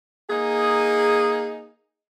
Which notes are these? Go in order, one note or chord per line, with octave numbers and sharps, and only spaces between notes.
A#3 D#4 G#4